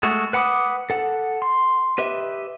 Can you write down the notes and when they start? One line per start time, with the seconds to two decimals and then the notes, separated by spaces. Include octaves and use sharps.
0.03 G#3 A3 F#4
0.33 B4 F#5 B5 D6 D#6
0.90 A4 F#5
1.42 C6
1.98 G4 B4 D#5 E5